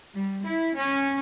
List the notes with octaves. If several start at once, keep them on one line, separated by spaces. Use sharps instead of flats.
G3
E4
C#4